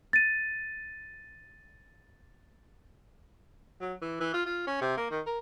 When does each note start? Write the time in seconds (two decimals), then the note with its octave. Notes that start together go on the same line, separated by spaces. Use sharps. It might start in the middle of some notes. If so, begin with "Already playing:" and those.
0.13 A6 D#7
3.81 F#3
4.02 E3
4.20 E3
4.34 F4
4.46 F4
4.67 C#4
4.81 C3
4.97 A#3
5.10 D#3
5.26 A#4